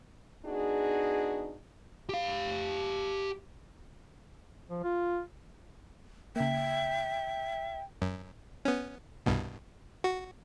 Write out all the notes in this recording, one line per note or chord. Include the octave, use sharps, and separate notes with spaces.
B3 D4 D#4 F#4 G#4
G4 F5
F3
F4
C#3 A#3 E5 G5
F#2
B3 C#4
C2 G2 B2
F#4